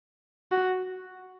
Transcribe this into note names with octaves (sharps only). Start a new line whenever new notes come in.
F#4